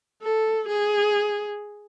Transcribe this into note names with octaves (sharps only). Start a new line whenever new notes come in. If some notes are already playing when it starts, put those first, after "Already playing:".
A4
G#4